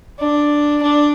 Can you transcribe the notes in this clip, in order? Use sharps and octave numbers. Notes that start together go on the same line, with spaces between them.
D4
D4